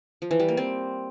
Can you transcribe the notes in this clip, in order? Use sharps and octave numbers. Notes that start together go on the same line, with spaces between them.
F3
E3
G3
A#3
C4